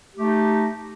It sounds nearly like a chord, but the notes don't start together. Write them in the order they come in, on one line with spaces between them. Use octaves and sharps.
G4 A3 D#4